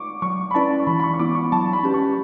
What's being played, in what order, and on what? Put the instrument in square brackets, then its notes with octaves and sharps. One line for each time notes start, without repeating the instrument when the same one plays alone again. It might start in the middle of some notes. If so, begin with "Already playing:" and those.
Already playing: [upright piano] C#6 D6
[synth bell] F#3 [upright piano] C#6
[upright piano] B5
[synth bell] C#4 E4 B4 D5 [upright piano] A5
[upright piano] C#6
[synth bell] E3 [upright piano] B5
[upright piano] B5
C#6
C#6
[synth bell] B3 E4 [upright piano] D6
[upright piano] C#6
[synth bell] F#3 [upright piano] A5
[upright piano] B5
[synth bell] C#4 G4 B4
[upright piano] C#6